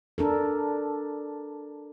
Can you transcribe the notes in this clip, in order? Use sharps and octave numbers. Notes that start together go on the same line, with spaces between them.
D4 A4 A#4